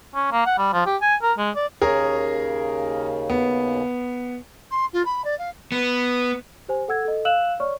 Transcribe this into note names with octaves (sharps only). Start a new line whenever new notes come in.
C#4
A#3
F#5
G3
F3
G4
G#5
A#4
G#3
D5
D#2 C#3 G#4 A#4 C#5
B3
C6
F4
B5
D5
F5
B3
G4 C5 G#5
A4 F#5 E6 G#6
A4 D#5
F5 E6 F#6 E7 F#7
C#5 D5 C#6 F6